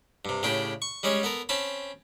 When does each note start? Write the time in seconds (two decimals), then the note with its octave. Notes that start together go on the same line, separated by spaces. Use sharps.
0.25 G2 C3
0.43 A2 C#3 D4 G4
0.82 C#6
1.03 G3 G#3 C#4 C#5
1.23 B3 A4 A#4
1.49 C4 C#4 A5 B5